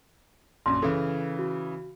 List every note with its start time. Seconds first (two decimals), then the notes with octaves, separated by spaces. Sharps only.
0.66 A#1 F#2 C6
0.82 C#3 E3 A4
1.39 F#4